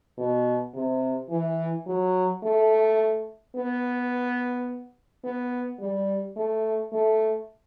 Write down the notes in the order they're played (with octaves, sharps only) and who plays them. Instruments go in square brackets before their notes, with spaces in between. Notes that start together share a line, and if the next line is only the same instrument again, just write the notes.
[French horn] B2
C3
E3
F#3
A3
B3
B3
G3
A3
A3